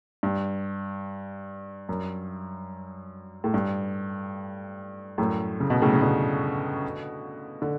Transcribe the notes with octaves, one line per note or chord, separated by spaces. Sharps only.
G2
F#2
A2
G2
F#2 A2
C#3
B2
A2 C#3
C#3
B2 D3
D3